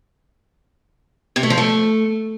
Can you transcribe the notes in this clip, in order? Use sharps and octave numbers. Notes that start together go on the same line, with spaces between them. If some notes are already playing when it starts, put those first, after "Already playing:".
C3
A3
F3
A3